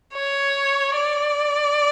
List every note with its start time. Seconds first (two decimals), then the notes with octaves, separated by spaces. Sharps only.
0.14 C#5
0.96 D5